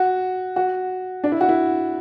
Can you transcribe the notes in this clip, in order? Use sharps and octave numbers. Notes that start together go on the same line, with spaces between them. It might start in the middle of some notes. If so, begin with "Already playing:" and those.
Already playing: F#4
F#4
D4
E4
F#4
E4